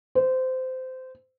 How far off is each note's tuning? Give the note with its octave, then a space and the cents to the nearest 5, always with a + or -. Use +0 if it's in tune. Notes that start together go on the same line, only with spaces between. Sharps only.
C5 -20